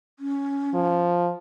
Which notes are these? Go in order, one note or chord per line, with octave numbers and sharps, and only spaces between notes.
C#4
F3